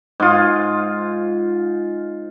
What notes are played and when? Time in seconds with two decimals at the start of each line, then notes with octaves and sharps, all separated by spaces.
0.20 G#2 F4